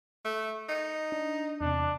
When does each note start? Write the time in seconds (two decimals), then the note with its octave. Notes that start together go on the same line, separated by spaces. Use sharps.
0.25 A3
0.69 D#4 C#7
1.12 D4
1.61 E2 C3 D4